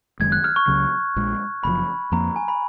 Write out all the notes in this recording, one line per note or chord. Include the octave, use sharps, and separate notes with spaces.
F#1 F#2 D#3 G#3 G#6
F#6
F6
C#6
C#2 C#3 F#3
A#1 A#2 G#3
F#1 F#2 F3 B5
F2 F3 A#3 A#5
G#5
B5